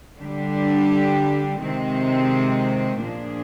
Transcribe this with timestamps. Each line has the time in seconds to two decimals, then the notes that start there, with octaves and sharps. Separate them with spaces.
0.18 D3 G3 D4 G4
1.60 C3 D#3 G#3 C4
3.01 A#2 F3 A#3 D4 G#4